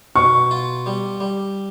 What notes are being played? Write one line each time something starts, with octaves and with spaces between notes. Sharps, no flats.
B2 C#6
F4
G3
G3